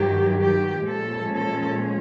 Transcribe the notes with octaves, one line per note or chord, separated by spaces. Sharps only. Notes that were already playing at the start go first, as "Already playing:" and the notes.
Already playing: G2 D#3 F#3 G4
G4
A#2 F3 G#3 C#4 A4
A4